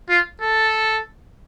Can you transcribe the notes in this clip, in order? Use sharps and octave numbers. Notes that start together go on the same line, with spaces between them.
F4
A4